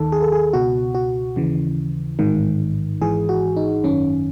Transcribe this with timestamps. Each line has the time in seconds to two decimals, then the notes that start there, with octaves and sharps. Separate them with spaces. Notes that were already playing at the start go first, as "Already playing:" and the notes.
Already playing: D#2 D#3 A4
0.12 G#4
0.22 A4
0.32 G#4
0.53 C#2 B2 F#4
0.95 F#4
1.36 D#2 C#3 E3
2.19 A1 G#2 D#3
3.02 G#1 G#2 E3 G#4
3.29 F#4
3.57 D#4
3.84 G#1 F#2 D#3 C#4